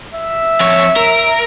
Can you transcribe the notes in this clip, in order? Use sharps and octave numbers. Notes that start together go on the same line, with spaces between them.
E5
F2 C#5
A#4